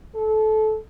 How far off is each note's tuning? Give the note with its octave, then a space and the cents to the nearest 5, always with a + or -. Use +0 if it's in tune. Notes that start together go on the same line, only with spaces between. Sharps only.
A4 -20